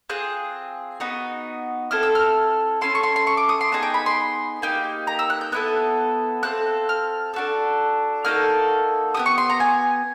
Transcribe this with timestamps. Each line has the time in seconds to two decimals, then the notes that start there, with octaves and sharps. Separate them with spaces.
0.09 C4 F4 G#4 F#6
1.00 B3 D#4 F#4
1.91 C4 E4 A4 F6
2.03 E6
2.15 F6
2.81 C#4 E4 A4 C6
2.95 C#6
3.03 C6
3.16 C6
3.27 C#6
3.37 D6
3.49 D#6
3.61 C6
3.72 B3 D#4 G#4 A5
3.83 G5
3.94 B5
4.06 C6
4.62 A#3 D#4 G4
5.07 A#5
5.19 E6
5.30 F#6
5.41 G6
5.52 B3 E4 A4 F#6
6.43 C4 F4 A4 F#6
6.89 F6
7.34 D4 F#4 A4
8.25 A#3 D#4 F#4 A4 F6
9.14 B3 D#4 G4 D#6
9.26 C#6
9.38 C6
9.50 A#5
9.60 G#5